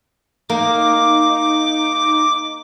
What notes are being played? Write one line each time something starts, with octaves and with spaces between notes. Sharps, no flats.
A#3 D#4 D6